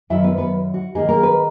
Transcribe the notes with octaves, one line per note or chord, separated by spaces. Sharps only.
F#2 D#3 F#3 E4 E5
B3 B4
B3 B4
F#4
D#3 A#3 D#4 G#4
A#3 A#4
B3 B4